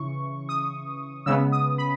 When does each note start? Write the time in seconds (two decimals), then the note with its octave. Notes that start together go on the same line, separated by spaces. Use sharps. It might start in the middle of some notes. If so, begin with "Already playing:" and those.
Already playing: C#3 E3 C#6
0.49 D#6
1.26 C#3 G#3 B3 E6
1.52 D#6
1.78 B5